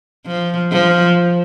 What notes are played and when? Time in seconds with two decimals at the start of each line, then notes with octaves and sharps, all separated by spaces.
0.27 F3
0.72 F3